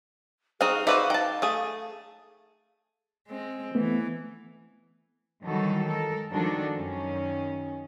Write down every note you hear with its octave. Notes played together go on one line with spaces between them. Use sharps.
C4 D#4 F#4 G#4 F5
D#4 F#4 B4 C5 D5 E5 F5
D#4 G5 A5
A3 G#4
G#3 C4
E3 A3 B3
D#3 E3 F#3 G3 F#4 A4
G#3 A4 A#4
D#3 F3 G#3 D4 F#4 A4
F#2 D#3 C#4